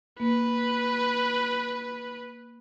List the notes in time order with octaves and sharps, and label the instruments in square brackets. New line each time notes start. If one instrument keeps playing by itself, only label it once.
[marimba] A#3 [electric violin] B4